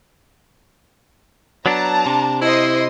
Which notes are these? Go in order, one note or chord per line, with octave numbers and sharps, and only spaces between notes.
F#3 B3 D4 A5 A#5
C3 D4
E4 C5 D#5 C6